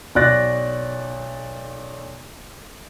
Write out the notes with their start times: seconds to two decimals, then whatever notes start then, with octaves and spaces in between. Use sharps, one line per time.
0.15 B1 F#4 D5 F#6 A6 A#6